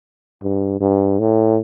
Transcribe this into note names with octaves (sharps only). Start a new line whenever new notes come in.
G2
G2
A2